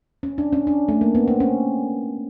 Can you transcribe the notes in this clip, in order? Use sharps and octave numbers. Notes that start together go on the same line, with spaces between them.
C#4
D4
C#4
D4
A3
A#3
B3
C4
C#4